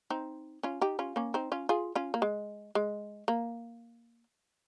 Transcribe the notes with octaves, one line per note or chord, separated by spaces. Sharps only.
C4 D#4
C#4 F4
D#4 G4
C#4 F4
A#3 C#4
C4 D#4
C#4 F4
F4 G#4
C#4 F4
A#3
G#3
G#3
A#3